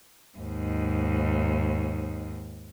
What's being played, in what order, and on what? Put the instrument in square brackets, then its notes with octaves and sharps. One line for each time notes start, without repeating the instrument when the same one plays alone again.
[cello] D#2 G#2